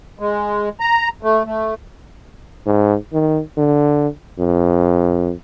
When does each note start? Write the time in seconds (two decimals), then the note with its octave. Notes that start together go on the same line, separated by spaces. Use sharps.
0.19 G#3
0.80 A#5
1.22 A3
1.45 A3
2.66 G#2
3.13 D#3
3.57 D3
4.39 F2